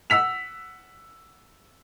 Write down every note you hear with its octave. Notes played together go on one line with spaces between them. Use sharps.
F#5 E6 B6 F7